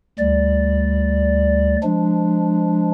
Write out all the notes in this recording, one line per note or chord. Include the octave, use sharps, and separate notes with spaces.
D2 G3 D5
F3 G#3 D4